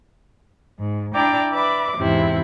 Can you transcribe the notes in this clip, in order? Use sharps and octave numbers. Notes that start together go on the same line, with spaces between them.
G#2
D4 E4 D5 G5 A#5 D6
B4 D5 E5 B5 D6
E2 G#2 C3 C4 E4